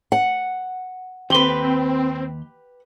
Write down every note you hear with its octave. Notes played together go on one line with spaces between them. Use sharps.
F#5
D#2 C4 G4 B4 C6